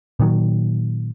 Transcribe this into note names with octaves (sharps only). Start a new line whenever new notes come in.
A#2 D#3 F#3